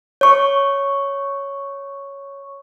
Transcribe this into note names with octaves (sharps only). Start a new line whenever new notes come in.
C#5 C#6